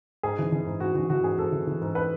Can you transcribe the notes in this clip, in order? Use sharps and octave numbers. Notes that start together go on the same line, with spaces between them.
G#2 G#4
E3
E3
G#2
G#2 F#4
E3 F#4
E3 F#4
G#2 G#4
G#2 A4
E3
E3
G#2
B4